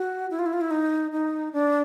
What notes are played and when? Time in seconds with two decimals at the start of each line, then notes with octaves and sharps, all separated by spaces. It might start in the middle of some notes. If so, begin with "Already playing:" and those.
Already playing: F#4
0.31 E4
0.39 F4
0.46 E4
0.53 F4
0.61 E4
0.71 D#4
1.13 D#4
1.53 D4